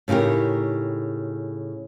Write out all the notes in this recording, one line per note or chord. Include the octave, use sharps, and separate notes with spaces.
A2 C#3 D#4 G4 A#4